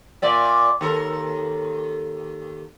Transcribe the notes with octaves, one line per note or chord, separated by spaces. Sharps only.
A#2 D5 E5
D#2 A4 A#4